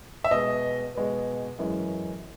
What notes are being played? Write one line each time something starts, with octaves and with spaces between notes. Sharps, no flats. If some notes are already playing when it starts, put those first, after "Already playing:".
E5
B2 G#3 B3 D#5
B2 G#3 B3
F#2 E3 G#3 C#4